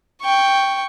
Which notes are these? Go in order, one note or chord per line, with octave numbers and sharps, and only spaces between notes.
G5 C#6